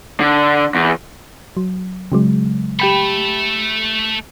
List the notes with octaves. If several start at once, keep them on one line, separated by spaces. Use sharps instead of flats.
D3
E2
F#3
C#3 F#3 G#3
A3 G4 A4 G5 B5